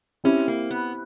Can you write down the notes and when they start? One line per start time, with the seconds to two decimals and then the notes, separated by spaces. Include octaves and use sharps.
0.24 C4 C#4 E4 G4
0.48 A#3
0.70 B3